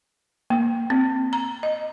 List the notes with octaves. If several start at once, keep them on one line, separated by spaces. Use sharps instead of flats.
A#3
C4
A#5
D#5